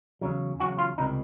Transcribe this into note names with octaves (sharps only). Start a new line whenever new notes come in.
E2 C#3 F#3
E2 C#3 F#3 F#4
F4
C#2 C3 D#3 G3 D#4